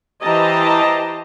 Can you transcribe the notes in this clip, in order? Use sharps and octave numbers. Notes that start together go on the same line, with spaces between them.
E3 G4 C5 D#5 A5 A#5